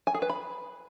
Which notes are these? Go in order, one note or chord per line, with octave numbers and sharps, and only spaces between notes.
G#5
G#4
B4
B5